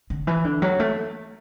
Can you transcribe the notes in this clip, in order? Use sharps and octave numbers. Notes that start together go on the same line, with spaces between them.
D3
E3
D3
F#3
A3